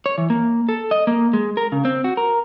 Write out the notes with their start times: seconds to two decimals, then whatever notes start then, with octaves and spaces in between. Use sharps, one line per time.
0.06 C#5
0.18 E3
0.30 A#3
0.69 A4
0.91 D#5
1.07 A#3
1.33 G#3
1.57 A#4
1.72 C#3
1.85 C4
2.04 F#4
2.17 A#4